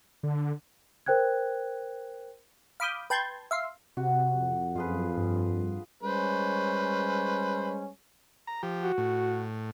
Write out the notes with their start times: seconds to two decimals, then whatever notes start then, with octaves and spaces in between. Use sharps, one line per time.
0.23 D3
1.06 A#4 C5 G5 F#6 G#6
2.80 F5 B5 D6 D#6 G6
3.10 B4 G5 A5 C6 G6 G#6
3.51 E5 F5 C6
3.97 C3 F#4
4.35 F2
4.76 F#2 F4 G#4 B4
5.17 G2
6.03 G3 G#3 C#4 B4 C5
8.47 A#5
8.63 F3 G4
8.83 F#4
8.98 A2